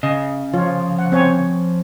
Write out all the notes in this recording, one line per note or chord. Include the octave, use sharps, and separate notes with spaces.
C#3 D#5
F3 F4 C#5
F#5
C4 C#5 G#5